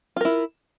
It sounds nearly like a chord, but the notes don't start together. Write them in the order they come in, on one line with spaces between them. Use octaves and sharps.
F4 A#4 E4